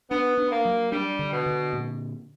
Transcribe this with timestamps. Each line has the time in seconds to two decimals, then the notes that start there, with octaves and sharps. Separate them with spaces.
0.10 B3 D4
0.38 D4
0.51 A#3
0.65 F#3
0.92 G3 D4
1.19 D3
1.33 B2
1.46 D3
1.73 A#2